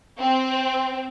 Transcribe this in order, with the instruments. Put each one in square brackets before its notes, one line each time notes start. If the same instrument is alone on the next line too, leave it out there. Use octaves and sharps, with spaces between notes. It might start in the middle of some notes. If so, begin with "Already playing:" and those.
[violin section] C4